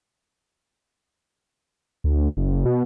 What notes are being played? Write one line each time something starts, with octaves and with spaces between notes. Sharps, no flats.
D2
F#1
B2